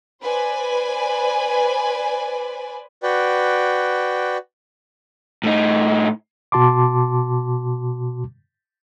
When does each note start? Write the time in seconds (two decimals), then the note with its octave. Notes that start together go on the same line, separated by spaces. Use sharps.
0.22 B4 C5 D5 G#5
3.03 F#4 B4 D5 G5
5.44 A2 D#4
6.52 B2 F#4 A5 C6 D6